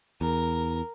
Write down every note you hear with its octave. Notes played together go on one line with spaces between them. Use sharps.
E2 A#4